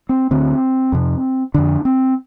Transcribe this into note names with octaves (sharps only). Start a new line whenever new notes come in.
C4
D2 D3 C4
F2 C3
F2 D3 D4
C4